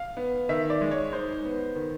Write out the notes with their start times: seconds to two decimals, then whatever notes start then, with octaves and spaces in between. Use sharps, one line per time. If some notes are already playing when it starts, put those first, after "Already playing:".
Already playing: F5
0.17 B3
0.49 D#3 E5
0.70 D5
0.81 G#3
0.91 C#5
1.12 D#4 C5
1.45 B3
1.76 D#3